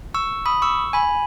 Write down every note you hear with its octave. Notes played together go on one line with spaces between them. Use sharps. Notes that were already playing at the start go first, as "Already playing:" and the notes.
C#6 E6
B5 D#6
C#6 E6
G#5 B5